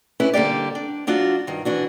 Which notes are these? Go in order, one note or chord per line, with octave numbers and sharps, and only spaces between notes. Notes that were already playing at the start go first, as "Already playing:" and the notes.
C#4 D4 E4 B4
D3 G3 A#3 G4 D5
D4
F#3 D4 F4 F#4
G2 D#3
E3 D4 F#4